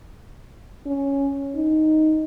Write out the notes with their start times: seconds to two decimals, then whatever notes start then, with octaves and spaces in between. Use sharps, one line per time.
0.86 C#4
1.55 D#4